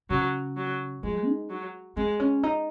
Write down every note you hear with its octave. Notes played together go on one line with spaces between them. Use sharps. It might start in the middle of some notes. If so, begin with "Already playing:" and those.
C#3 F#3
F#3
F3 G#3
D#4
F#3
G#3 C4
C#4
D#4